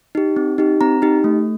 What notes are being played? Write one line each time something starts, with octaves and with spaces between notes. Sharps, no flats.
D#4 G4
C4
D#4 G4
C4 A#5
D#4 G4
A3